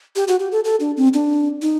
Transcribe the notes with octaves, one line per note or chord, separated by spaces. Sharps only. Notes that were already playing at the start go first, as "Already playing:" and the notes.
G4
F#4
G4
A4
A4
D4
C4
D4
D#4